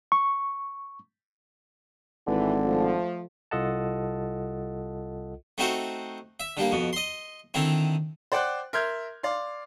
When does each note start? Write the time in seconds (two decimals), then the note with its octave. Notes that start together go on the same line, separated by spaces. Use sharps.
0.12 C#6
2.27 G#1 D3 E3
2.64 F3 A3
3.51 C2 F4 A4 D#5 F#5 A5
5.58 A3 C4 D#4 F#4 C5
6.40 E5
6.57 D3 G3 A#3
6.72 F2 B2
6.93 D#5 C6
7.54 D3 D#3 C4 E4
8.32 C5 D5 F#5 G5 F#6
8.73 A#4 E5 C6 F6 G6 G#6
9.23 D5 F5 C6